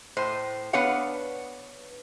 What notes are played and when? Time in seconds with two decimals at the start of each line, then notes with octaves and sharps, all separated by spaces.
0.17 A2 C5
0.73 B3 D4 B4 C#5 F5 F#5